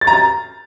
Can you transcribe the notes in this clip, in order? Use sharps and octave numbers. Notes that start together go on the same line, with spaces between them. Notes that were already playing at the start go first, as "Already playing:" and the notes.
A6
A#5
A6